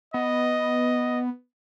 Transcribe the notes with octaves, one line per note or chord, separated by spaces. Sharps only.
B3 D#5